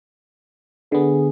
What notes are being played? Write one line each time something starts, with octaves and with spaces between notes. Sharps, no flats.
D3 B3 G#4